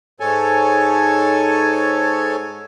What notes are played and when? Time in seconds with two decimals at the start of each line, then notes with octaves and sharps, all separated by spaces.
0.20 G#2 A4 C#5 G#5